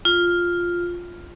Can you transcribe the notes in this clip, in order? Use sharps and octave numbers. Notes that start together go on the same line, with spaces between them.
F4